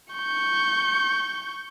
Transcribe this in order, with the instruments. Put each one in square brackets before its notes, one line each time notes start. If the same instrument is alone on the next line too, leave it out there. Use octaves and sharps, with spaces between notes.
[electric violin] C#6 G6